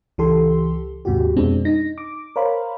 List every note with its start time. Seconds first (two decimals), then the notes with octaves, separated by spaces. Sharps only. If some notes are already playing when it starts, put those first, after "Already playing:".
0.18 C#2 E3 G4 A4 C6
1.05 D#2 G#2 C3 F#4 G4
1.36 F2 B2 G#3 C4 D4
1.65 D#4 A#6
1.98 D6
2.36 A#4 C5 C#5 F5 B5